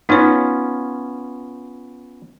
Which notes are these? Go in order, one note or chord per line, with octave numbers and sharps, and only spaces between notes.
B3 C#4 D#4 F4 C#5